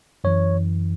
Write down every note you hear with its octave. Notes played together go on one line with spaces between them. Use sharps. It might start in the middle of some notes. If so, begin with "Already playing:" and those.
F#2 E3 C#5